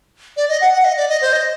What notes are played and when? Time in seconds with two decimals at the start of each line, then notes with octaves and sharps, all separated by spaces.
0.37 D5
0.49 D#5
0.61 F#5
0.73 F#5
0.84 D#5
0.97 D5
1.09 D#5
1.21 C5
1.33 D#5